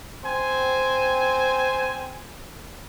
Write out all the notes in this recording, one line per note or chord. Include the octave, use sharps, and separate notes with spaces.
C4 C5 G#5